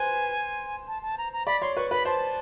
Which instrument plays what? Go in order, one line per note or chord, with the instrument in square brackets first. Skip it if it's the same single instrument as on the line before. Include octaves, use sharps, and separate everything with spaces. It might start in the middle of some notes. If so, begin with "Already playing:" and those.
Already playing: [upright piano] B4 C5 [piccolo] G#5
[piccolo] A5
A5
A#5
A#5
[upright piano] D5 [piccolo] B5
[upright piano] C#5 [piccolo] C6
[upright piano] B4 [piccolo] C#6
[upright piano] B4 [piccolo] B5
[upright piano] C5 [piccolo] A5